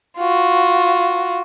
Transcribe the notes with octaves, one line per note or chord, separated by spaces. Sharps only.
F4 F#4